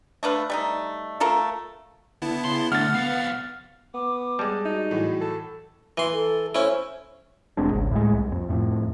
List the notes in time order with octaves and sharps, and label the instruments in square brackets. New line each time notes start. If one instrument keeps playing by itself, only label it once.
[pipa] A3 D4 B4 F5
G3 A3 D#4
A3 F4 A4 A#4
[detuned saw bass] D3 [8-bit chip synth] B3 E4 A5
[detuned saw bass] C#3 [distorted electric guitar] C6
[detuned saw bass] D3 [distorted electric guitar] A3 D4 [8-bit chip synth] F#5 [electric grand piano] F6 A6
[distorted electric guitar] C2 F5 [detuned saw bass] B3
[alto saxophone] B3 [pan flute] D6
[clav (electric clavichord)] G3 G#3 [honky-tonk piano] D5 A5
[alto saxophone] D#4 [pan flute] F#4
[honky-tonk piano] A2 E3 F#3
[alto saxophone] A4
[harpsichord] E3 C6
[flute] A4
[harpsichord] C#4 E4 [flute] C5
[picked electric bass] E1 G#3 C4 D4
G#1 C#2
A2 G#3
C2
F2
F2 A2